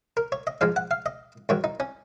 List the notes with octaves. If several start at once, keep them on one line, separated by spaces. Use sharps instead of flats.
A#4
C#5
D#5
G#2 F3 G#3 F5
F#5
F5
D#5
G#2 D#3 F#3 C#5
D#4
C#4